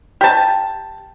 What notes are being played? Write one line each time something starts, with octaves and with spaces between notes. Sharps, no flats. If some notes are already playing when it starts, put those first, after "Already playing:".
G4 A5